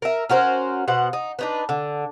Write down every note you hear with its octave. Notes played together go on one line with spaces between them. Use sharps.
A#4 E5
C#4 F#4 A#4 C5
B2 C5 F#5
D#4
D4 D#4 B4
D3